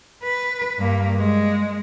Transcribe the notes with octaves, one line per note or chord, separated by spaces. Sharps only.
B4
G2 A#3
G#3